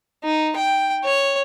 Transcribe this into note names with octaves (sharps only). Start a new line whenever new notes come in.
D#4
G5
C#5